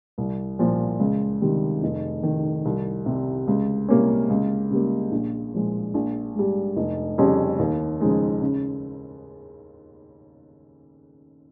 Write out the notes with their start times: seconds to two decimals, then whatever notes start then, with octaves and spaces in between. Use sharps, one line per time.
0.18 C2
0.59 A#2 F3
1.00 C#2
1.42 C3 D#3 G3
1.83 F1
2.23 F2 D#3
2.65 C2
3.06 C3 G3
3.48 C#2
3.88 C3 G3 A#3 C#4
4.30 C#2
4.71 C#3 G3 A#3
5.12 A#1
5.54 A#2 F3 G#3
5.94 A#1
6.35 G#2 G3
6.77 F1
7.18 F2 C#3 G3 C#4
7.59 D#2
8.00 C#3 F3 G#3 D#4
8.42 C#3